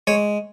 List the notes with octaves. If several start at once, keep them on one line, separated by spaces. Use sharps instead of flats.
G#3 C#5